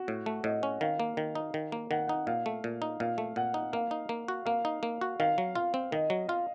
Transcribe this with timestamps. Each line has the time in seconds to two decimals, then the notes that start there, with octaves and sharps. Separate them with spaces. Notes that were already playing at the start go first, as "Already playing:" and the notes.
Already playing: F#4
0.08 A2
0.26 A3
0.44 A2 D#5
0.63 C#4
0.81 D#3 F5
1.00 A#3
1.17 D#3
1.35 D#4
1.54 D#3
1.72 A#3
1.91 D#3 F#5
2.08 D#4 F#5
2.27 A#2 F5
2.46 A3
2.64 A#2
2.82 D#4
3.00 A#2 F5
3.18 A3
3.36 A#2 F#5
3.54 D#4
3.73 A#3 F5
3.91 D#4
4.09 A#3
4.28 F#4
4.46 A#3 F5
4.65 D#4
4.83 A#3
5.01 F#4
5.20 D#3 F5
5.38 F#3
5.55 F4 F5
5.74 C4
5.92 D#3 D#5
6.10 F#3
6.29 F4 F5